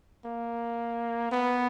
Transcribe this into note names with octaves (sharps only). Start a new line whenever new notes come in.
A#3
B3